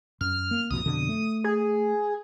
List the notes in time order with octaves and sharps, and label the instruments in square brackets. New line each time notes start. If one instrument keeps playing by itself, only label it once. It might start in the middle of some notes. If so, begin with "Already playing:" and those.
[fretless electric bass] F#2 [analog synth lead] F6
[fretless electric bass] A#3
[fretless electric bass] C2 F2 B2 [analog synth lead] D#6
[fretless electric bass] F2 B2 D3
A3
[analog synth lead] G#4